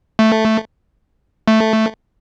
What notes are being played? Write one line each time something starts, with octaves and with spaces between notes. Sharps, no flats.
A3
A3